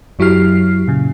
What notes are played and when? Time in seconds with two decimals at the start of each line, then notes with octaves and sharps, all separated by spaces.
0.19 F#2 F#3 E4 G4 F6 C7
0.88 A#2 C#3